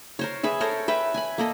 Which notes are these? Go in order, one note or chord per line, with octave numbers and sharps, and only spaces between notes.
A#4 C5 C#5
G#4 B4 E5
A4 A#4 C5 C#5
B4 E5 G5
G#5 B5
A#3 A4 D#5